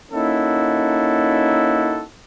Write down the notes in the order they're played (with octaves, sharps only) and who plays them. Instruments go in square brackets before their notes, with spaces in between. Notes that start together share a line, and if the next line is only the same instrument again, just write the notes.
[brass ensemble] A#3 C#4 D#4 E4 F#4 A4